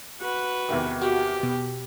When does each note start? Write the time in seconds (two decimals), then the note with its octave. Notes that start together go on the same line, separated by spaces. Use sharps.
0.20 F#4 B4
0.68 E2 C3 D#3
1.02 F#4 G4
1.43 B2